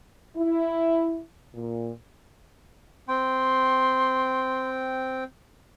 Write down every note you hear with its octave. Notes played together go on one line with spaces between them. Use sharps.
E4
A#2
C4 G5 C6